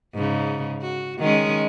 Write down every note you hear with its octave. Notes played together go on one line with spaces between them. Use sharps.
G#2 C#3
F#4
D#3 G#3 C#4